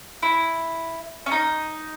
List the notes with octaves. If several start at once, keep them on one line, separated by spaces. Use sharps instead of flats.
E4
C#4
D#4